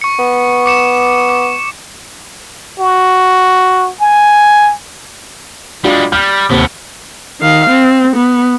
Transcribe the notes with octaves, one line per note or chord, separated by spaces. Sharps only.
C#6 C#7
B3
D6 C#7 E7
D6
F#4
G#5
G3 G#3 D4 F4 F#4
G3 F6 G6
D#2 A2 C3 B3
D#3 F5
C4
B3